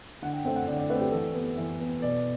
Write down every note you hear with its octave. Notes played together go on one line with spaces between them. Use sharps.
D3 F#5
G5
A3 C4 G5
F#5
D3 D5
D5
A3 C4 B4
G4
E3 A4
B3
E3
B3
B2 D5